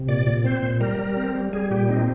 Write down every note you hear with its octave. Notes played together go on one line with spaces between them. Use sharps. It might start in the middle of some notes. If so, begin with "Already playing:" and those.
Already playing: C3
A#2 D5
A#2
C4 C5
A#2
G3 A#4
G3
C4
G3
G3 G#4
A#2 G4
C4 D#4